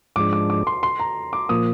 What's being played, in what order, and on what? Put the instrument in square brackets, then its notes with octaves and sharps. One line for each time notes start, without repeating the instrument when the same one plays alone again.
[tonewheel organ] G#2 F3 G#3 D4 [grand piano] D6
[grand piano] D6
D6
C6
C6
A#5
D6
[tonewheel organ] A#2 F3 A#3 [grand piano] D#6